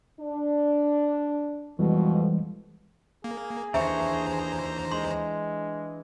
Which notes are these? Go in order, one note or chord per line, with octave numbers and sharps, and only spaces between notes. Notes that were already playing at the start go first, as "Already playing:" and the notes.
D4
F2 B2 E3 G3 G#3
A#3 G#4
D#2 E3 D4 C5 E5 A#5 C#6
G#3 C6